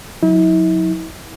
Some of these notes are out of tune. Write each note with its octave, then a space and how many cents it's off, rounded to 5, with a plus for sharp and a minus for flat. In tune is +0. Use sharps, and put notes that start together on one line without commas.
F#3 -40 E4 -40